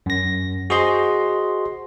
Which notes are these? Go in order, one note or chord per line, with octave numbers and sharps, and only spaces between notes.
F#2 A#6
F#4 G#4 C5 D#5 C6